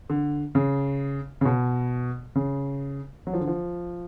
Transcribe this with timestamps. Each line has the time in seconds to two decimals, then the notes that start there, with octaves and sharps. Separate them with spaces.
0.10 D3
0.55 C#3
1.41 C#3
1.45 B2
2.35 C#3
3.27 F#3
3.33 F3
3.41 D3
3.47 F3